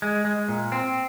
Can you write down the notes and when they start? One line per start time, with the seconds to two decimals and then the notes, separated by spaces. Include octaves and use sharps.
0.02 G#3
0.25 G#3
0.49 A#2
0.72 C4